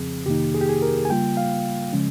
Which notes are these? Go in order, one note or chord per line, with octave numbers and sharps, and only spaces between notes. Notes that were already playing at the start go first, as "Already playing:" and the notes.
Already playing: F2 C#3 F3 C4 G#4
F2 C3 D#3 A#3 D#4 G4
G#4
G4
G#4
A#4
G#5
C#3 G3 A#3 F4 G5
F5
C#3 F3 G#3 C#4